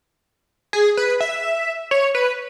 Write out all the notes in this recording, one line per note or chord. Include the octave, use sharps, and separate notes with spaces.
G#4
B4
E5
C#5
B4